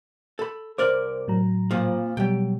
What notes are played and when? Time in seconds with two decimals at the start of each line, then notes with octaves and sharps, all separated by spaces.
0.39 A4 B5
0.78 C2 A#4 C5 D5 D6
1.28 A2 F#3 A#5
1.71 F2 A#2 F3
2.17 B2 F#3 G3 G5